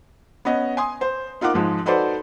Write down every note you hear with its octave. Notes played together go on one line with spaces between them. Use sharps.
B3 C#4 D#5
G#5 C6 D#6
C5
D#4 F4 A#4 F#5 D6
G#2 F3 G#3
D#4 F#4 A4 B4 C5 D5